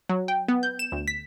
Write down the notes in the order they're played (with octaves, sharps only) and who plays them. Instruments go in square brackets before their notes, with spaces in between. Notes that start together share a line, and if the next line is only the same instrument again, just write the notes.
[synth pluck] F#3
G5
B3
G6
E7
D2
B6